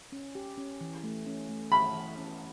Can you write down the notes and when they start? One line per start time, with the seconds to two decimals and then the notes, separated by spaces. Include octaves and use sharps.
0.12 C#4
0.35 G4
0.57 C#4
0.81 E3
1.04 A3
1.26 C#4
1.49 A3
1.72 E3 B5
1.94 E3
2.18 C#4